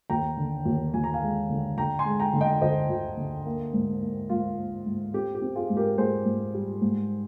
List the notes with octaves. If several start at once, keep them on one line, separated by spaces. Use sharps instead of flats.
D#2 G5 A#5
D3
D#2
D#2 G#5
A#5
F5 G#5
G#3
D3
D3 G5 A#5
G#5 C6
G#3
G5 A#5
D3
D#5 G5
D2 C5 D#5
D2
D3
A#3
G#2
A#3
G#2 F4
A#3
G#2
C4 G4
G4
C4
F4 G#4
G#2
G4 A#4
G#2 G#4 C5
G#2
G3
G#2